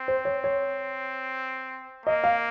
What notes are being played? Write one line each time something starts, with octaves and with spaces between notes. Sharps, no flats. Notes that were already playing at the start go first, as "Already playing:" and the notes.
Already playing: C4
C5
C#5
C#5
A#3 D#5
F5